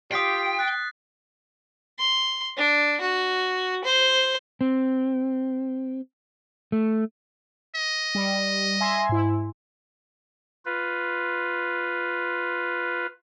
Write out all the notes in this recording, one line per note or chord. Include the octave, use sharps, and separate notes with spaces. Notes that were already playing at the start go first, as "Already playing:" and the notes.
F4 G4 G5 D#6 B6 C7
F#6 A6
C6
D4
F#4
C5
C4
A3
D#5
G3
E5 G#5 C6
G#2 E4
F4 B4